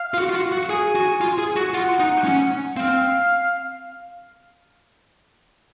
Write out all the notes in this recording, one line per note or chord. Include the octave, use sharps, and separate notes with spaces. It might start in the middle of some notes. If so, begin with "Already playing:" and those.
Already playing: F5
F4
F#4
F4
F#4
F#4
G#4 G#5
F#4
F4
G#4
F#4
F4 F#5
D#4
C#4
C4 F5